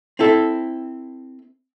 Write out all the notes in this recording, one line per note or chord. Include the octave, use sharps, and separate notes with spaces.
C4 E4 A4